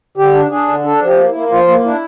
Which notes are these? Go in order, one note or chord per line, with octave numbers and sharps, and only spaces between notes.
D3 G4
D4
D4 G#4
D3
D4 A4
F3 G4
A#3
E4
A#3
F3 F4
A#3
D4 E4